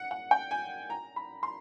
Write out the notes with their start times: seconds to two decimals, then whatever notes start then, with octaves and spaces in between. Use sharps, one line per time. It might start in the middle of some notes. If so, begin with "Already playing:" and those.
Already playing: F#5
0.11 F#5
0.31 G5
0.51 G#5
0.90 A#5
1.16 B5
1.43 C6